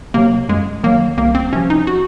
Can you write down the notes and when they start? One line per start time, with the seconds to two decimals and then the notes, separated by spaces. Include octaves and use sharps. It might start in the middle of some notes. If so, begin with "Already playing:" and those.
0.14 C3 F#3 A#3
0.49 F#2 G#3
0.83 D#3 F#3 A#3
1.17 C2 A#3
1.35 C4
1.52 C3 F3 C#4
1.70 D#4
1.87 F#4